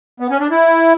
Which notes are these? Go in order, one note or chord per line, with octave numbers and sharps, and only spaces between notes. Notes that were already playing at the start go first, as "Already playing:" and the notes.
B3
C#4
D4
E4